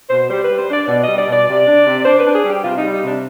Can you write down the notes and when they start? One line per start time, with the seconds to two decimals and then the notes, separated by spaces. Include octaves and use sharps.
0.10 B2 C5
0.30 G3 C5
0.44 G3 B4
0.59 C5
0.69 D4 D5
0.88 B2 D5
1.04 G3 D#5
1.18 D5
1.27 B2
1.33 D5
1.47 C3
1.66 D4
1.86 C3
2.05 D4 C5
2.20 B4
2.25 D4
2.35 G#4
2.45 G3
2.50 G4
2.64 C3 F4
2.78 G3 D#4
2.93 D#4
3.03 C3 D4